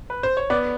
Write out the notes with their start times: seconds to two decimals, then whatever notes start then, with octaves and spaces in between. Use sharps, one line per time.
0.10 B4
0.23 C5
0.37 C#5
0.50 B3 D5